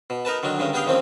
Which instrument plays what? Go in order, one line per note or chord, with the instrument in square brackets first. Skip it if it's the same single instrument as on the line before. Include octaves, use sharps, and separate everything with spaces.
[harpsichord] B2
D#4 A#4 B4 A5
D3 D#3 F#3 D4
G2 D#3 G#3 C#4
B3 D4 G4 G#4 F5 G5
D#3 F3 A#3 C4 C#4